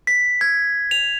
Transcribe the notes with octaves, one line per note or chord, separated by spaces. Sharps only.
B6
G#6
F7